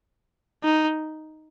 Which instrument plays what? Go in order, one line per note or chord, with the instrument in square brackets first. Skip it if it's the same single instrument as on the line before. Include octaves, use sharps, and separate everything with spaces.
[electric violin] D#4